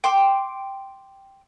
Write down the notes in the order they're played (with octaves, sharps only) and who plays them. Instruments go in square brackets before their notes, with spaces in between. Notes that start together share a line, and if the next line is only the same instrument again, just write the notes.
[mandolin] G5 C6 D6